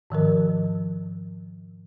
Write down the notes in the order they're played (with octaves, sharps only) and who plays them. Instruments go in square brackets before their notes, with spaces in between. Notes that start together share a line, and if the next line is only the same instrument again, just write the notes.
[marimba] G#2 D#3 F3 A#4